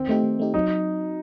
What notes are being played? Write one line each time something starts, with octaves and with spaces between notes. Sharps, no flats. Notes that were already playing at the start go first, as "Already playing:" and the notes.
Already playing: D#3 C4
A3 D#4 G4
D#3
A3 D#4 G4
F#3 D#4